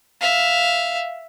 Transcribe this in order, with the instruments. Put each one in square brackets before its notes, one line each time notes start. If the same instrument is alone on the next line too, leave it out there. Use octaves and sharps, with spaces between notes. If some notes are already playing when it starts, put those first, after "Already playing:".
[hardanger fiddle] E5 F5